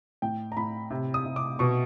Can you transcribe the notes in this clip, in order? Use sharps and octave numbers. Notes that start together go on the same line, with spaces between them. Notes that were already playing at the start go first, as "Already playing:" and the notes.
A2 G5
A#5
A2 B5
C3
D#6
C3
D6
B2 C#6